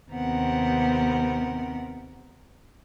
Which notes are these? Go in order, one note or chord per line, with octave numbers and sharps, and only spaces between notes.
D#2 C3 B3 C4 A#4 F#5